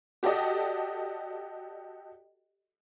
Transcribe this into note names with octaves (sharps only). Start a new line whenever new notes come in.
F#4 G4 A4 D5 D#5